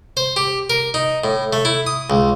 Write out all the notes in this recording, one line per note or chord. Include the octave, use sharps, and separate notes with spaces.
C5
G4
A#4
D#4
A2
A3
E4
D#6
C#2